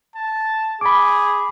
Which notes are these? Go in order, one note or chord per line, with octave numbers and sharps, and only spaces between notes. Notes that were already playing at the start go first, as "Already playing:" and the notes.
A5
G#4 B5 D6